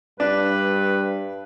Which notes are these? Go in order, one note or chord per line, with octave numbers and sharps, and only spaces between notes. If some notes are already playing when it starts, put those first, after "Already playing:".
G2 D4 B4